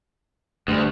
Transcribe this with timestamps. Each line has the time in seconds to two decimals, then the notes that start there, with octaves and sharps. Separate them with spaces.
0.68 D2 G2